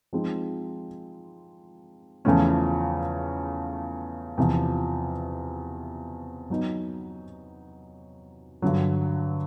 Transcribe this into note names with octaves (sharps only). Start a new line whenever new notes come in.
F3 G#3 C4 D#4
E2 C#3 F3 A3 C#4
E2 C3 F3
F#3 B3 D#4
G2 D3 F#3